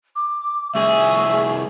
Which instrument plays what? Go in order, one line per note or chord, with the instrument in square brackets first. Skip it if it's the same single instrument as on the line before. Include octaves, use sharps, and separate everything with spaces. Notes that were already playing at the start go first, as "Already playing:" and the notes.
[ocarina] D6
[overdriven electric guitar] C2 G#4 [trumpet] E5 [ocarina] C#6